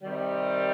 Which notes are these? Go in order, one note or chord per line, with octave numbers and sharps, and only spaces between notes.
C3 D#3 G3